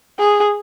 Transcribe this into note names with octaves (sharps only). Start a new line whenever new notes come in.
G#4